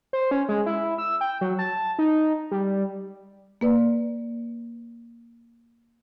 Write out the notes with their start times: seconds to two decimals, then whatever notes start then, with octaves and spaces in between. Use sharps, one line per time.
0.13 C5
0.31 C#4
0.49 G#3
0.66 E4
0.98 E6
1.21 G5
1.41 F#3
1.59 A5
1.99 D#4
2.51 G3
3.61 A#3 B4 D5